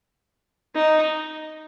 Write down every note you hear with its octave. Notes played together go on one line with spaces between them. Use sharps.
D#4